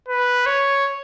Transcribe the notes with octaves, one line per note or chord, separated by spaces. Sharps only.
B4
C#5